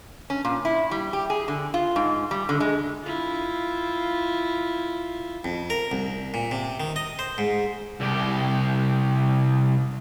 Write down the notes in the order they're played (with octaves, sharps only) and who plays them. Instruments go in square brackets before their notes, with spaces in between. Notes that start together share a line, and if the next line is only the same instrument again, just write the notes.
[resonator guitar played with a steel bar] C#4
A#2
E4
G3
G4
G#4
D3
F4
G#2
G3
D3
G#3
[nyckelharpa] E4 F4
[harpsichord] F2
A#4
C2
A#2
C3
D#3
D#5
C5
G#2
[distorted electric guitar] C2 G4